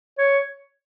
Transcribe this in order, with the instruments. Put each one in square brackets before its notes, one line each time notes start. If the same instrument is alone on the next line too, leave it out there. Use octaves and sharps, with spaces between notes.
[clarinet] C#5